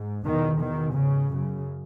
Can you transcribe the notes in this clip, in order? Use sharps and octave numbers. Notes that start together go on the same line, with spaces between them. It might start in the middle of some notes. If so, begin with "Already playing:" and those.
Already playing: G#2
E2 B2 D#3
E2 B2 D#3
G#2 C#3
F#2 C#3